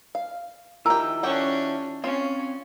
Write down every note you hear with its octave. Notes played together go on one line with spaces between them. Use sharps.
F5
D#3 E4 F4 G4 A#4 E6
C#4 D4 G4 F#5
C4 C#4 F4 F5